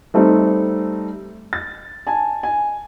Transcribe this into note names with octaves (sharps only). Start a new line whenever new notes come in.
G3 A3 C4 D#4 A4
A6
G#5 A5
G#5